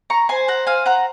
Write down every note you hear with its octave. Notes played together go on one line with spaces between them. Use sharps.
A#5 C#6
C5 G#5 C6
F#5 A#5
F5 G#5
F#5 A#5